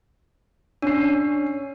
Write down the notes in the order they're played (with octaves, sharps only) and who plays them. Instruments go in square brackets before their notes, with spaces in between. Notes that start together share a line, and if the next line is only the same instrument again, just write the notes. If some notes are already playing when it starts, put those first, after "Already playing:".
[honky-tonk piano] C#4 C7 [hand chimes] D4